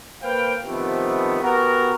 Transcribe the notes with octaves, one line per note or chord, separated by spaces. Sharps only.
A#3 B4 C5 F5 G5
C3 D#3 F3 A3 B3
B3 F#4 G4 A#4